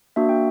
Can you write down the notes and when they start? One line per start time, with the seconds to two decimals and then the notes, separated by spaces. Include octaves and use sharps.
0.16 A#3 D4 F#4 E5
0.29 G5